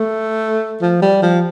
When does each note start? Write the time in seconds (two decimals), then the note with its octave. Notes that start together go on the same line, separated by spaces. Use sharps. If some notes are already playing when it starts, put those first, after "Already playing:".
Already playing: A3
0.82 F3
1.02 G3
1.22 F3